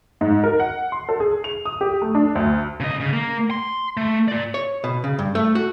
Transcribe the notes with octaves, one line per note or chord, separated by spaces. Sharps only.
G#2
A#4
F#5
C6
A4
G#4
F7
D#6
G4
A3
D4
D2
C#3 D#5
C#3
A#3
C6
A3
F4 D5
C#5
B2
C#3
G2
A3
F#4